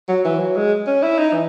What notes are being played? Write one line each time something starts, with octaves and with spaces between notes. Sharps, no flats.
F#3
E3
F#3
G#3
C#4
E4
D#4
E3